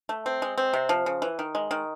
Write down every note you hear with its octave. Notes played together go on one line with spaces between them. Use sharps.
A3
C4
G#3
C4
C3
F3
C#3
E3
D#3
G#3
D#3